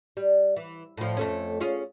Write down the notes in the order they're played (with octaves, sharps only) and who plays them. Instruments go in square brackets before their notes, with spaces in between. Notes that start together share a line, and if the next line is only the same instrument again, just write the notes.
[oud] G3
E3
A2 F3
F2 A3 C#4
C#4 F4 G#4